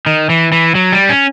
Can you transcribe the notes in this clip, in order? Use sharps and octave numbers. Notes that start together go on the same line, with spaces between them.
D#3
E3
E3
F#3
G3
C#4